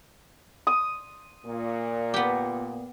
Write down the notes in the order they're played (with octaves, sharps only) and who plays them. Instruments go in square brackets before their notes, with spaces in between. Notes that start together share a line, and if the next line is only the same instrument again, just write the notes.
[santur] D#6
[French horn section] A#2
[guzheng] B3 G4